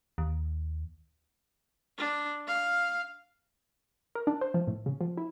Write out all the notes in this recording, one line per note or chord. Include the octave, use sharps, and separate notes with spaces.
D#2
D4
F5
A#4
D4
C5
F3
A2
C#3
F3
E4